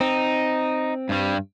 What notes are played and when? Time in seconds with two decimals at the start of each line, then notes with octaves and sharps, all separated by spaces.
0.01 C4 D#4
1.09 G2 G3